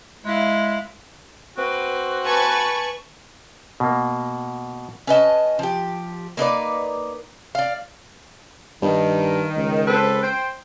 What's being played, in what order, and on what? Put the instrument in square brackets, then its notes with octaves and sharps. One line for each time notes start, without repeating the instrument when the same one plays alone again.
[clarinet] G#3 [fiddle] E4 F5
[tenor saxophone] C4 [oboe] F#4 [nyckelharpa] B4
[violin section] B4 C#6 [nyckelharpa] G#5 A5
[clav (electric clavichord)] B2 A#3
[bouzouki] C#4 B4 D#5 A5
F3 G4
A#3 D#4 B4 D5
D5 F5
[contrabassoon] G2 [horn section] D#3
[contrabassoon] C#2
[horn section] C4 A4 B4
C5 G5